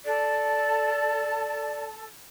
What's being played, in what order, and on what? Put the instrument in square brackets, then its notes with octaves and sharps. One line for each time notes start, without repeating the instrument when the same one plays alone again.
[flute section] A4 A5 [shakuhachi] D5